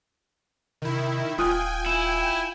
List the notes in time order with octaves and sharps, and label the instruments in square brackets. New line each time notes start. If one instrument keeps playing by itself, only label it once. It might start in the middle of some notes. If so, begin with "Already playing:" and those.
[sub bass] C3 [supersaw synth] D#3 E4
[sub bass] D#1 [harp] F4 D#6 F#6 [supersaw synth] G5 G#5
[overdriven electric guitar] E4